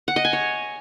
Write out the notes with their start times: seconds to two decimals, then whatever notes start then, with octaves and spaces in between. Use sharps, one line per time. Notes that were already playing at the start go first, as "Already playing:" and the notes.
0.08 F#5
0.16 D#5
0.25 G#5
0.33 C#5